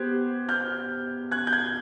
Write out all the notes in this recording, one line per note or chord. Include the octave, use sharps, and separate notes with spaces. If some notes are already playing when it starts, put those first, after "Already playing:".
Already playing: B3 G4 C5 F#6 G#6
F6 G6
F#6 G#6
G6
F#6 G#6